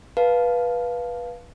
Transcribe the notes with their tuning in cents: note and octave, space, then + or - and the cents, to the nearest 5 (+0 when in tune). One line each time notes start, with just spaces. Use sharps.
B4 -15 F5 +0 A5 -10